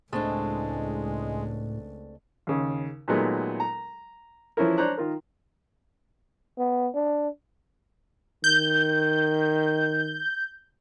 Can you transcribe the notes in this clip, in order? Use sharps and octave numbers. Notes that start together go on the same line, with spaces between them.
C#2 A2 G#3 A3 C4 D4
D#2 C#3
A#2 D#3 F#3 G#3 A3 B3
A#5
E3 F3 C#4 E4 A#4
D4 C5 C#5 A#5 F#6
D#3 F4 A#4
B3
D4
D#3 G6